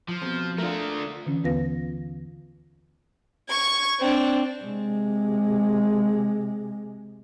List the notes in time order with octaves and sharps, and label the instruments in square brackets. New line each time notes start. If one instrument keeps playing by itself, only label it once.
[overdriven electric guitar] F3
[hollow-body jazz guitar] F2 B2
[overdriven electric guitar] A3 D4 [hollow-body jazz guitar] F4 A#4
[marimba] D3 E3 C#4
D#2 B3 F4 B4 F5 A#6
[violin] C#6 G#6
C4 D4
[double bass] C3 G#3